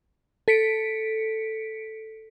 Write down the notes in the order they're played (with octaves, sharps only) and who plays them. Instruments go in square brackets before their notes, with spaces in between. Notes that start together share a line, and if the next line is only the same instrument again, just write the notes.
[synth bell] A4 B6 C#7 D7